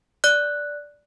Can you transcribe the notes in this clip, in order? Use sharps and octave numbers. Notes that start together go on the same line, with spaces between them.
D5 F#6